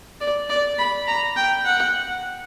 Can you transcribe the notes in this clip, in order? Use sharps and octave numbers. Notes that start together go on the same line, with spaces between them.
D5
D5
B5
A#5
G5
F#5